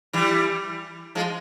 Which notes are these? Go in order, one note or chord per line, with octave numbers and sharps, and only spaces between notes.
E3 G3
F3 G#3